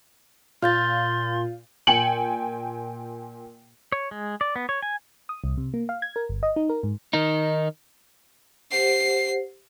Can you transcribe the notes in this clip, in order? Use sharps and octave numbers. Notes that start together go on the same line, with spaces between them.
A#2 F4 C6 F6 G6 A6
A#2 G5 G#5 C#7 F#7
C#5
G#3
D5
B3
C#5
G#5
D#6
C2
C3
A#3
F5
G#6
A#4
G1
D#5
D#4
A#4
G#2
D#3 D#4
G4 C5 F#5 C7